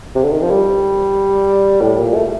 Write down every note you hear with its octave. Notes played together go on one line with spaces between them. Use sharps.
C3
D3
D#3
F3
G3
A2
A#2
A3